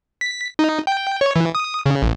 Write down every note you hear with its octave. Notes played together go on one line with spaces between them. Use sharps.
B6
D#4
G5
C#5
E3
D#6
C#3
A1